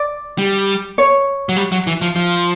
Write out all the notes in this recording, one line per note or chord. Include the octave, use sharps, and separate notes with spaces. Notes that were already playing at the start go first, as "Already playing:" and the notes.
Already playing: D5
G3
C#5
F#3
G3
F#3
E3
F3
F3